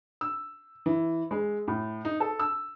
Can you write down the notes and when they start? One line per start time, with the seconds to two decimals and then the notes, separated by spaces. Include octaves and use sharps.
0.21 E6
0.86 E3
1.31 G#3
1.68 A2
2.05 D#4
2.20 A4
2.39 E6